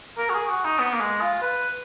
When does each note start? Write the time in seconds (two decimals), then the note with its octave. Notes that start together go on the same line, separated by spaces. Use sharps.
0.18 A#4
0.29 F#4
0.34 G#4
0.49 F#4
0.65 D#4
0.80 B3
0.93 A#3
1.00 G#3
1.22 F4
1.42 B4